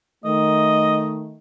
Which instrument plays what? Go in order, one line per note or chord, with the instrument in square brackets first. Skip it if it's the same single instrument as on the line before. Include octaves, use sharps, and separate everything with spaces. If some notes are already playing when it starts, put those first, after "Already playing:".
[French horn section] D#3 A3 [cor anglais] D#5